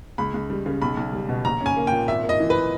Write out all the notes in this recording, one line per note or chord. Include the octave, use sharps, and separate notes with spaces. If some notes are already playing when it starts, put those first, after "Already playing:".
C#2 B5
C#2
G3
C#3
B1 B5
B1
G3
B2
A#1 A#5
C#4
G#5
A#3
A#2 G5
G#1 E5
A#3
D#5
E3
B4